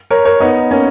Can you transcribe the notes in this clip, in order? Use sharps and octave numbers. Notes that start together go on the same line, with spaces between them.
A#4 C#5
A#4 C#5
B3 D#4
A#3 C#4